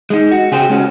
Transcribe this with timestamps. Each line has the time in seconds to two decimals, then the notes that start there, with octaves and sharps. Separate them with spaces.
0.10 G#3 D#4
0.31 F#4
0.52 C#3 G4 G#4 C5
0.70 G#3 C#4 F#4